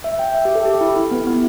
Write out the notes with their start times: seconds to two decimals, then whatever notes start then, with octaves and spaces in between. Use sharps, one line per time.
0.04 E5
0.19 G5
0.35 E5
0.45 G4
0.55 A4
0.65 G4
0.81 E4
0.96 E4
1.11 B3
1.27 B3